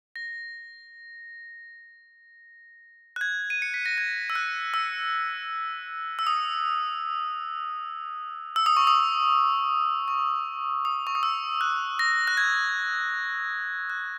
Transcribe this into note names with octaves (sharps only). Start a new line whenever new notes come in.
A#6
F#6
G#6
D#7
C#7
B6
A#6
G#6
E6
F#6
E6
E6
D#6
E6
D#6
C#6
D#6
C#6
D#6
C#6
D#6
E6
F#6
A#6
F#6
G#6
F#6